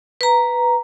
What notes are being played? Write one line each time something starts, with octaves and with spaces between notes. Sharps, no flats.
B4 A#5